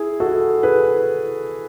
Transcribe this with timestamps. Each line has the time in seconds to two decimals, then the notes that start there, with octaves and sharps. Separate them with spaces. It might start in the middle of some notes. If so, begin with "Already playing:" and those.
Already playing: E4 G#4
0.20 F#4 A4
0.63 G#4 B4